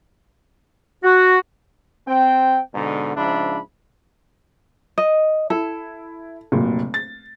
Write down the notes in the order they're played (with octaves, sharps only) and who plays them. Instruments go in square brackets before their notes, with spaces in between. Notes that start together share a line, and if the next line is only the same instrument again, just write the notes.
[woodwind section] F#4
[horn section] C4 G5
G#2 B2 D3
G#2 C#3 F3 D4 E5 B5
[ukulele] D#5
[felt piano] E4 [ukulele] A4
[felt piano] F1 A#2 F#3
A6